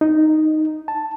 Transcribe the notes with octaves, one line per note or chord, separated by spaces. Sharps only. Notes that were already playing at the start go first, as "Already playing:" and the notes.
D#4
A5